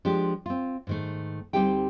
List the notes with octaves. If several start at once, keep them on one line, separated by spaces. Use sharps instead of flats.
F3 G#3 D4 G4
C4 F4
G#2 D#3 A3
D2 G3 C4 D#4 G4 G5